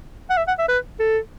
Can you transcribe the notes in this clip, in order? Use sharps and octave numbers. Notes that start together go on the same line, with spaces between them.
F#5
E5
F#5
E5
B4
A4